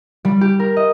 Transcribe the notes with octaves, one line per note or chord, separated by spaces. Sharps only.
G3
G4
A#4
D#5